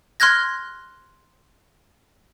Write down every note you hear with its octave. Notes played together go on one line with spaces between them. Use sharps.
C6 F6 F#6 G#6 A#6